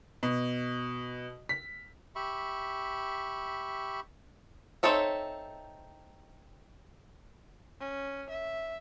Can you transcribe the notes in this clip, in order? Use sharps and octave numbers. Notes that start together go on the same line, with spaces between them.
B2
B6
G4 E5 B5 C#6
C4 D#4 A4 C#5 E5
C#4
E5